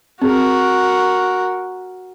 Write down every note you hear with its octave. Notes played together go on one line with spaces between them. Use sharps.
C4 F#4 G#4 A#4